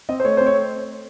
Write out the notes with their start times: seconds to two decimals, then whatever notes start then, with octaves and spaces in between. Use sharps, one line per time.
0.09 C4 D#5
0.20 C5
0.24 A3 C#5
0.37 C4 C5
0.46 C#5